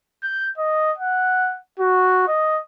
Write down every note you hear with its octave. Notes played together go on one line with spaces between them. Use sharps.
G6
D#5
F#5
F#4
D#5